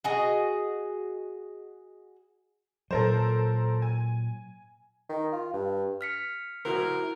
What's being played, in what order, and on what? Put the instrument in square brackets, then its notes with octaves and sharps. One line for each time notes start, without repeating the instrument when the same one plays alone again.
[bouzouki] F#4 G#4 D#5
[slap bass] A#2 F#3 [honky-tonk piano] A4 A#4 C5
[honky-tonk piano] G#5
[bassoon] D#3
F4
G2
[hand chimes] F6 B6 C#7
[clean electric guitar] E4 F#4 C5 [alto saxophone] A#4